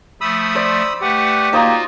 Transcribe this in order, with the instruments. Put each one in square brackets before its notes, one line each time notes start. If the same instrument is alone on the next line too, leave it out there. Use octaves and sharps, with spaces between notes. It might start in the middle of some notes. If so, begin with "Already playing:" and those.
[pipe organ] F3 A3 [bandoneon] B5 D#6 E6
[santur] C5 D5
[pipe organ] A3 B4 F#5 [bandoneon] G4
[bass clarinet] A#3 [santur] D#4 C5 D#6 [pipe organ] F4 F#4